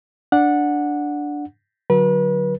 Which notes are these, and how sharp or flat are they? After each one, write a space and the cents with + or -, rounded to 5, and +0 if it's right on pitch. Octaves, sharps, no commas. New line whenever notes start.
D4 +0 F#5 -15
D3 +0 F#3 +0 B4 -35